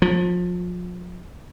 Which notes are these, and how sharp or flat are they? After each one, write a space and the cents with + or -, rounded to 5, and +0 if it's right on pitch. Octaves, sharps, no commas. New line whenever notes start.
F3 +30